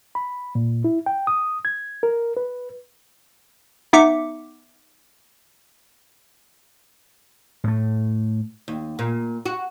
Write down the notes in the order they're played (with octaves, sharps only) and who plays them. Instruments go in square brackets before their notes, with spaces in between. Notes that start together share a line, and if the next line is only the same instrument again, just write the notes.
[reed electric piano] B5
A#2
E4
G5
D#6
G#6
A#4
B4
[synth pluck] B3 D#4 E5 D6 C#7
[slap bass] A2 A3
[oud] D#2
A#2
F#4